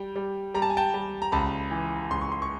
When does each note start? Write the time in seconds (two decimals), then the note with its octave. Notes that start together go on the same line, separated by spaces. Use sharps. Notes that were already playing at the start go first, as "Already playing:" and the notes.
Already playing: G3 G5
0.16 G3
0.54 G3 A#5
0.62 A5
0.70 G#5
0.77 G5 A5
0.94 G3
1.22 A#5
1.32 C#2 A5 B5
1.71 E3
2.11 C#2 C6
2.21 C#6
2.32 C6
2.42 C#6